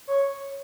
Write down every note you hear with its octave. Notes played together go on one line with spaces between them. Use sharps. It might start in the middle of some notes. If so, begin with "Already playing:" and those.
C#5